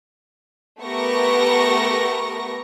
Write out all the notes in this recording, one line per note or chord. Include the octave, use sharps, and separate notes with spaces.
A3 B3 G4 A#4 C#6 A#6